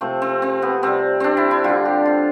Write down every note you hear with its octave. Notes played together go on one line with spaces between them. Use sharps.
C3 F3 A3 C4
C4
C4
B3
C3 G3 C4
C4 D4
E4
E4
D3 G3 F4
G4
F4